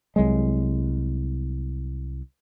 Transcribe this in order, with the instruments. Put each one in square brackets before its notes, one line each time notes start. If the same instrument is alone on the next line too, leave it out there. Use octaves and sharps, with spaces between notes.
[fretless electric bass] C2 F#3 G#3